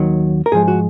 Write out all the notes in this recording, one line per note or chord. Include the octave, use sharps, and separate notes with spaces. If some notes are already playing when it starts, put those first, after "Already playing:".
Already playing: D#2 D#3 F#3
A#4
G#2 F3 G#3 G#4
F#4